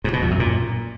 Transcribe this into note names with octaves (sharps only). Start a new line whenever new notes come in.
G#2
B2
F2
F#2
A#2